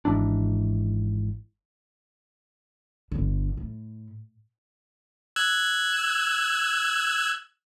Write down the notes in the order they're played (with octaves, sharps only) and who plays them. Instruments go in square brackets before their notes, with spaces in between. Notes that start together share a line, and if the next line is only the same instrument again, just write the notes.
[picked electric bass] G#1 G#2 E3 D4
[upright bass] G1 D3
A2
[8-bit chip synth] E6 F#6 G#6